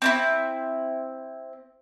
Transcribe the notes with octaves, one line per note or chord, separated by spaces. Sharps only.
C4 D4 E4